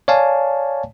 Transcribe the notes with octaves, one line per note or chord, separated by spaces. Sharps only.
C#5 D5 F5 G#5 A5